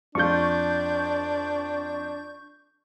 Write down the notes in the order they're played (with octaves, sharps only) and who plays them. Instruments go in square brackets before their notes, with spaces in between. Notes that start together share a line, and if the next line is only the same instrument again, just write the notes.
[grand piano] F2 F4 [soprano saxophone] D4 [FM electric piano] C#6 G6